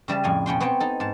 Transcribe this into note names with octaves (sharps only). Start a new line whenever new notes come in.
C#3 G3 E5 A5
F2 A2 A#3 G#5
B2 C#4 G5 C6
B3 C4 C#5 G5
D#4 A4
G#2 A5